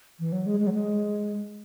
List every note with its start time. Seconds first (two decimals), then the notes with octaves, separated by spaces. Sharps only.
0.19 E3
0.32 F#3
0.46 G#3
0.60 G#3
0.67 F#3
0.73 G#3